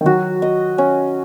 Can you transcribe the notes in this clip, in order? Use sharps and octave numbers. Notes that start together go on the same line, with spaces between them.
D#3
F#3 F#4
D#5
C#4